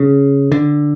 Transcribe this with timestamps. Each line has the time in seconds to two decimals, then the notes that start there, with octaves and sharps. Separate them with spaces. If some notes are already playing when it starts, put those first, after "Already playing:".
Already playing: C#3
0.52 D3